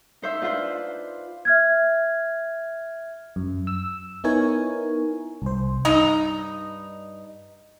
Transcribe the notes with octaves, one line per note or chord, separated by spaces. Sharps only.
D#4 C5 E5
D4 F4 B4 C5
E5 F6 G#6
F#2
E6
B3 D#4 E4 A#4 C#5 G#5
C2 C5
G2 D#4 D#5 A#5